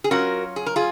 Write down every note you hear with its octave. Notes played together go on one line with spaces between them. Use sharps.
G#4
F#3 C#4 F4 F#4 A#4
G#4
A#4
F4 G#4